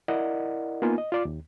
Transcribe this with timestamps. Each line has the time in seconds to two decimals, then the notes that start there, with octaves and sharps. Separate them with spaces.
0.08 E4 A#4 D5 D#5 F#5
0.82 A#3 B3 D#4 F4 G#5
0.98 D#5
1.12 F4 D5 D6
1.25 D#2